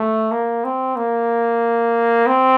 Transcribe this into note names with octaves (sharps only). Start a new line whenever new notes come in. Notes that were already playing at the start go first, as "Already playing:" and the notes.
Already playing: A3
A#3
C4
A#3
C4